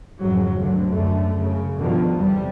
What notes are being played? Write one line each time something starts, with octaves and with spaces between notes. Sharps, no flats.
F2 G#2 C#3 F#3
G#1 D2 G2 D3 F#3
F#2 D3 A3
F#2 C#3
G2 B2 D3 D#3 F3
E2 C3 G3